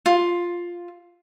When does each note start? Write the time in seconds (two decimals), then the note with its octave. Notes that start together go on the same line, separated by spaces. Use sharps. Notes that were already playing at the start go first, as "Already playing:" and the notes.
0.06 F4